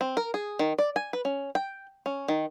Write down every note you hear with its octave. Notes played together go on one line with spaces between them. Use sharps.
C4
A#4
G#4
D#3
D5
G#5
B4
C#4
G5
C#4
D#3